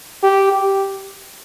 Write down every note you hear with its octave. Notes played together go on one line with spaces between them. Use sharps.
G4
G4